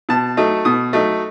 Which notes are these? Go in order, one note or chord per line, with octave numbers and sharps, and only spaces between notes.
B2 A5
F#3 A3 D#4
B2 D#6
F#3 A3 D#4